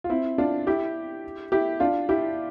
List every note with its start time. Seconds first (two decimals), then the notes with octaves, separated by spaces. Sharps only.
0.04 F4
0.10 C4 E4
0.38 D4 F4
0.67 E4 G4
1.52 E4 G4
1.80 D4 F4
2.09 E4 G4